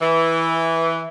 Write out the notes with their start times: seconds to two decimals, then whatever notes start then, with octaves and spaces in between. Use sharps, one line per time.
0.01 E3